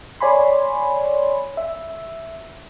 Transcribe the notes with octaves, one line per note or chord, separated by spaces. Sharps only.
C#5 D5 G#5 B5 C6
E5